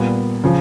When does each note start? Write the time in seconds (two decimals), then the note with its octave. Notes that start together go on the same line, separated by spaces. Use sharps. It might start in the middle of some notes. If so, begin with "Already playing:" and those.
Already playing: A#2 G3 B3
0.44 C#3 F3